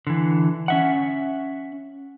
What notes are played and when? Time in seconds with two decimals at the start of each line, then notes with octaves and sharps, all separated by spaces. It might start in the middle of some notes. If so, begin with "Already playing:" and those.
0.07 D3 E3
0.68 C#4 E5 F#5